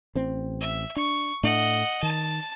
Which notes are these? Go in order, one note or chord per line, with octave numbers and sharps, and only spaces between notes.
A1 C4
E5
D4 C#6
A2 A3 D4 D#5 F#5
D#3 A5